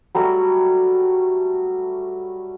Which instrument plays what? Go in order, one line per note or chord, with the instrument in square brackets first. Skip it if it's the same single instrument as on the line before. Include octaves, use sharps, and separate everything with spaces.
[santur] F#3 G3 A3 F#4